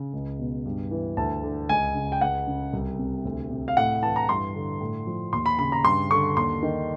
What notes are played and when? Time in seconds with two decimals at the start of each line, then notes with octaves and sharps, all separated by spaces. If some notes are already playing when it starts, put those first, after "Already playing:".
Already playing: C#3
0.13 C#2
0.39 B2
0.65 G2
0.91 E3
1.17 D2 A5
1.43 D3
1.69 C#2 G#5
1.95 C#3
2.12 G5
2.21 C#2 F#5
2.47 C#3
2.73 C2
2.99 C3
3.25 D2
3.51 C3
3.68 F5
3.77 A2 F#5
4.03 E3 A5
4.16 A#5
4.29 G2 C6
4.55 D3
4.80 A2
5.07 F3
5.33 D#2 C6
5.46 B5
5.59 C#3 B5
5.72 A#5
5.85 G2 C6
6.10 D3 C#6
6.37 D#2 C6
6.63 D#3